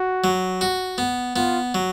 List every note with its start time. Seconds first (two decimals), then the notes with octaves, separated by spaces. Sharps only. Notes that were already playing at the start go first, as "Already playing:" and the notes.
Already playing: F#4
0.24 F#3
0.61 F#4
0.98 B3
1.36 B3 F4
1.74 F#3